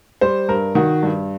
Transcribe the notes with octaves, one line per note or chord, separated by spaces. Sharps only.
G3 C5
G2 A#4
D#3 F#4
G2